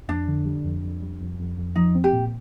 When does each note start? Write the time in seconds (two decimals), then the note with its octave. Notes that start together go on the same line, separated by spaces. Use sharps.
0.08 F2 D4
0.27 D3
0.45 G3
0.64 F2
0.83 F2
1.02 G3
1.20 F2
1.39 F2
1.57 F2
1.76 F3 D#4
1.95 C4
2.04 G4
2.13 A#2